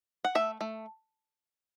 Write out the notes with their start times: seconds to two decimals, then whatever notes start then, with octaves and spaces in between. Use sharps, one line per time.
0.25 F#5
0.35 A3 E5
0.61 A3